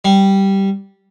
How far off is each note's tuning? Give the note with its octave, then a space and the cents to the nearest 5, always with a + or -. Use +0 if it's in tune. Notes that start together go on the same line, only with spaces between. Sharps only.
G3 -5